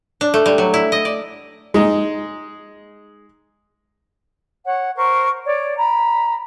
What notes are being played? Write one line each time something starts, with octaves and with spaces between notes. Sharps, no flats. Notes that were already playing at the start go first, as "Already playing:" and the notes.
D4
A3
G3
F#3
E4
D#5
D5
G#3 D#4
C#5 F#5
A#4 C5 C#6
C#5 D5
A#5 B5